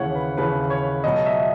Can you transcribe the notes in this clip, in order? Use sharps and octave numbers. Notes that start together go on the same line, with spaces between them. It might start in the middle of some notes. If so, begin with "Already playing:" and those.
Already playing: D#2 C#3 E3 C#5 F#5
B4
D#2 C#3 E3 B4
C#5
C#2 B2 F#3 D#5
E5